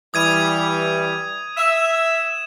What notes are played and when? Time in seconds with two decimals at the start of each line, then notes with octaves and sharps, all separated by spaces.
0.14 E3 G3 D#6 G#6 D#7
1.57 E5 E7